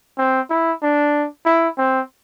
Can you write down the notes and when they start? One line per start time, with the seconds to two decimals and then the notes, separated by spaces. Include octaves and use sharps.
0.18 C4
0.50 E4
0.83 D4
1.46 E4
1.78 C4